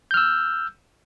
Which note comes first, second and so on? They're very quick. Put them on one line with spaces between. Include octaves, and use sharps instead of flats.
G6 F6 E6